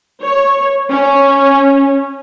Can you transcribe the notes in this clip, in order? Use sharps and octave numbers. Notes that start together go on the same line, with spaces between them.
C#5
C#4